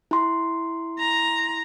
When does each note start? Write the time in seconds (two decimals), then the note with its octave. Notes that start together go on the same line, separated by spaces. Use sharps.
0.11 E4 C6
0.99 A#5